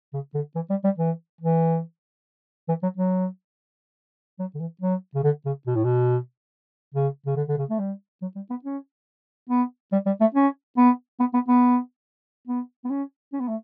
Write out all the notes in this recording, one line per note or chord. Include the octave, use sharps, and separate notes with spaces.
C#3
D3
E3
G3
G3
E3
E3
E3
F#3
F#3
F#3
D3
E3
F#3
C#3
D3
C#3
B2
A2
B2
C#3
C#3
D3
D3
C#3
A3
G3
F#3
G3
B3
C#4
B3
G3
G3
A3
C#4
B3
B3
B3
B3
B3
B3
C#4
C#4
B3
A3